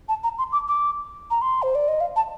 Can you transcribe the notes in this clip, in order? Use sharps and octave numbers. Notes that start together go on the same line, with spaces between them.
A5
A#5
C6
D6
D6
A#5
C6
C5
D5
D#5
F5
A5